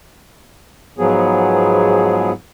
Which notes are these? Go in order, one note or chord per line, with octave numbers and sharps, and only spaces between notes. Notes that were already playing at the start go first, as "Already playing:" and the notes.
G#2 F3 F#3 B3 G#4